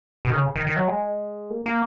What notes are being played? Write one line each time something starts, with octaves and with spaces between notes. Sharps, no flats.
B2
D#3
C#3
D#3
D#3
F#3
G#3
A#3
A#3